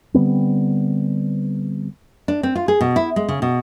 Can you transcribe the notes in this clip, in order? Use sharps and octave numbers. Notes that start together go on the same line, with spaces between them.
D3 G3 B3 C4
D4
C4
F4
G#4
B2
E4
G#3
C#3
B2